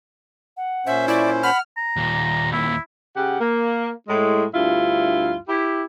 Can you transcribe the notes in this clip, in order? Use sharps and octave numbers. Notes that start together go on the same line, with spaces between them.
F#5
A#2 C#4 C5 E5
E4 D5 C#6
F#5 B5 F6
A#5
D#2 A#2
E4
C#3 G4 F#5
A#3
A2 G#3
D2 G2 E4 F4
E4 G4